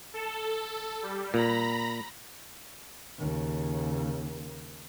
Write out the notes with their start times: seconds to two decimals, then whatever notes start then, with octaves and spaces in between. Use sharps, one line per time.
0.14 A4
1.02 G3
1.34 A#2 A#5 B5 A#6
3.19 D#2 C#3